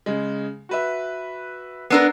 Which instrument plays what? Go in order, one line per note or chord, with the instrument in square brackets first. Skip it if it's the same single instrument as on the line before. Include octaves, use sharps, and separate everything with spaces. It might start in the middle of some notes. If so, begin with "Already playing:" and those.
[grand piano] C#3 G#3
F#4 B4 E5
[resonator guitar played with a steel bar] B3 D4 A#4 [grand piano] E6 C7